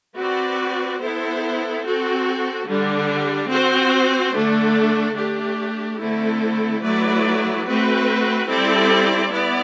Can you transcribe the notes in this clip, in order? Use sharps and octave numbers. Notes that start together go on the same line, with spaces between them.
C4 F#4 B4 D5
B3 E4 A4 C5
C4 F#4 A4
D3 G3 D4
C4 F#4 C5
D3 A3 D4 A4
A3 D4 G4
D3 A3 C4 E4 A4
F#3 A3 E4 B4 D5
A3 C4 F#4 B4
G3 C4 E4 A4 D5
B3 E4 D5